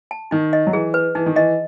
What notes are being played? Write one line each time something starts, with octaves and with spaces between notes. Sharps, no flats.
A5
D#3 D#4
D#5
F#3
E3 G#4
B4
E3 D#4
D#3
E3 D#5